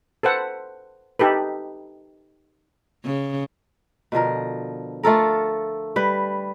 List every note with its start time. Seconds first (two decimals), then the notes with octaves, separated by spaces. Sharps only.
0.23 A4 B4 C5 F#5
1.19 D#4 G4 A4 B4
3.05 C#3
4.12 B2 D3 F3 A#4
5.03 A3 F4 A4 A#4
5.96 G3 B4